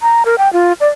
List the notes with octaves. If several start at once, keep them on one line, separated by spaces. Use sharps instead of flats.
A#5
A#4
G5
F4
D5